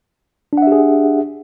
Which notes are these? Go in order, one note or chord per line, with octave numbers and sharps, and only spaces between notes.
D4 G4 G#4 E5 F#5